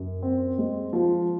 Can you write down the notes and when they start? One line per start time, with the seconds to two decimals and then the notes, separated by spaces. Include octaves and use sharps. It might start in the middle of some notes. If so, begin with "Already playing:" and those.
Already playing: F#2
0.23 C4
0.58 G#3
0.93 F3